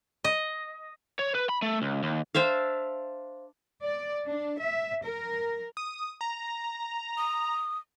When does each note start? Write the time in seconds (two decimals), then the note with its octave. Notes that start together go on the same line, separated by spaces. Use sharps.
0.24 D#5
1.19 C#5
1.35 B4
1.49 B5
1.62 A3
1.82 C#2
2.03 D#2
2.35 D4 C5 E5 F5
3.82 D5
4.28 D4
4.60 E5
5.05 A#4
5.77 D#6
6.21 A#5
7.18 D#6